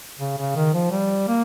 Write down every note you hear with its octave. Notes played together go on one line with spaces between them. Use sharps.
C#3
C#3
D#3
F3
G3
A#3